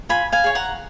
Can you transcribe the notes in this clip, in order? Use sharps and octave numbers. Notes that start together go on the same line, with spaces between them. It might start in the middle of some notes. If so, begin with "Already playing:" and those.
F4 G#5 B5
F5 G#5
G#4 C#5
F#5 A#5